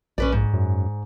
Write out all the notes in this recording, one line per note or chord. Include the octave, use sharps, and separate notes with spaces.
A#1 C#4 B4 D5
G#2
F#2